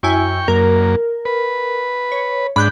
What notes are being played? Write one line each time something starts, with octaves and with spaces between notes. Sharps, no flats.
F#2 E4 G5 G#5 C#6
F#2 A#3 A#4
B4
C#5
G#2 D4 B5 F#6 G6